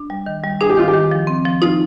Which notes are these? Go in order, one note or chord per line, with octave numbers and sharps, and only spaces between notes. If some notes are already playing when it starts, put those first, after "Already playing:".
Already playing: D4
G3
D#3
G3
D4 G#4
G4
D#3 F4
G4
D#3
F3
C4
F3
D#4 F4